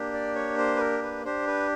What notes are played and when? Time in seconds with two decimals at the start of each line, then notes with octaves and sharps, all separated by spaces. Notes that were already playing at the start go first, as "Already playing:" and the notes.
Already playing: A#3 D4 G4
0.14 D5
0.35 C#5
0.58 C5
0.76 B4
0.80 A#4
1.03 B4
1.25 D4 G4 C5
1.47 B4